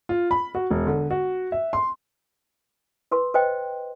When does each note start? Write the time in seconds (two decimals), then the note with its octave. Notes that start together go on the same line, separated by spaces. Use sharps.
0.09 F4
0.31 B5
0.55 F#4
0.71 E1
0.87 D3
1.11 F#4
1.52 E5
1.73 C6
3.11 A#4 B4 C6
3.34 B4 C5 D#5 G5